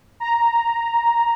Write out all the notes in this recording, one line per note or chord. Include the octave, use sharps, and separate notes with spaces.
A#5